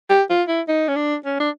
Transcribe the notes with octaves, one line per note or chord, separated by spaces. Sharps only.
G4
F4
E4
D#4
C#4
D4
C#4
D4